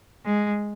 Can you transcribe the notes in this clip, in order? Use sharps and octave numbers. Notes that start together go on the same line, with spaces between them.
G#3